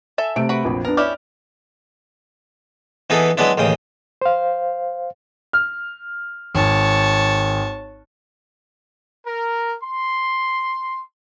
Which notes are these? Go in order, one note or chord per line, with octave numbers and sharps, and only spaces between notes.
A4 E5 G#5
C3 A3 D7
F#4 B4 B5
A#1 F2
B3 D4 A#4
C#4 E4 G4 D5 F6
E3 B3 D#4 E4 G#4 A4
F#3 G#3 B3 D4 E4
A1 D#2 C#3 G5 D#6
C5 F5
F6
G#1 C#5 A5
A#4
C6